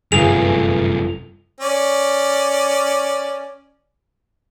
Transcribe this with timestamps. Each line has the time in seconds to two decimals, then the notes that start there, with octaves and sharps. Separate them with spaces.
0.12 G1 F#2 C3 G#4 B4 D7 F7
1.60 C#4 D5